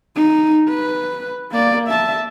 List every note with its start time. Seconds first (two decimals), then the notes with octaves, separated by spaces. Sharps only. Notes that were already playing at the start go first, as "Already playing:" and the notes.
0.15 D#4
0.68 B4
1.52 A#3 D5
1.88 E5 A5